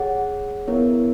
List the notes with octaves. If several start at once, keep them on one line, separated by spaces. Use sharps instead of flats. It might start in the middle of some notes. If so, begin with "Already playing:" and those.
Already playing: G#4 C#5 F#5
B3 E4 A#4 C#5